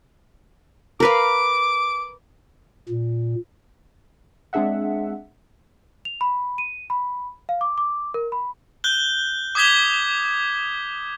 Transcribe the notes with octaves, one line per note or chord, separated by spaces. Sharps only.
A#4 B4 F5 D6
A#2
G#3 C4 D4 G#4 E5 F#5
F7
B5
D#7
B5
F5
D6
D6
A#4
B5
F#6 G6 G7
D6 D#6 G#6 B6 G7